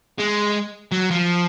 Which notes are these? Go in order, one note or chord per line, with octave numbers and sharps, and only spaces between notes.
G#3
F#3
F3